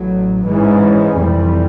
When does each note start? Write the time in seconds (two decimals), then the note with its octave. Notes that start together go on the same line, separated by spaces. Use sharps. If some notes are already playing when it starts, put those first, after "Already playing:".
Already playing: A1 A2 F#3
0.47 G#2 E3 G#3 C#4
1.16 F1 F2 C3 E3 G3